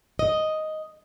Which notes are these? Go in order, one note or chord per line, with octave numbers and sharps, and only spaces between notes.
D#5